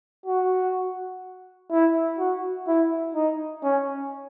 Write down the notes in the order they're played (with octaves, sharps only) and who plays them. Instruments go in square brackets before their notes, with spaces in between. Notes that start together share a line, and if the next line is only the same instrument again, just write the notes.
[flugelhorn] F#4
E4
F#4
E4
D#4
C#4